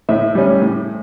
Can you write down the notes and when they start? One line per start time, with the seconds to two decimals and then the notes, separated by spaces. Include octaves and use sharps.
0.09 A2 E5
0.35 G3 C#4
0.62 A2